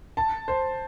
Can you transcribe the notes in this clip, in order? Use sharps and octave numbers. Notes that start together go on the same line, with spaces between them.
A5
C5